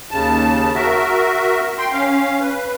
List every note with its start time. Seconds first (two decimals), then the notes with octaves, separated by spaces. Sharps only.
0.11 D#2 C#3 A5
0.74 F#4 A#4 E5
1.78 G5 C6
1.92 C#4 F5
2.40 B4